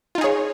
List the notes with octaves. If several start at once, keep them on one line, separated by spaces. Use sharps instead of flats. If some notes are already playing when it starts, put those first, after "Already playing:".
D#4 F4 G#4 C#5